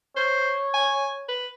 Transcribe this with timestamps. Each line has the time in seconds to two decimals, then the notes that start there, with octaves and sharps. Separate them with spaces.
0.17 C5 C#5
0.74 G#5
1.29 B4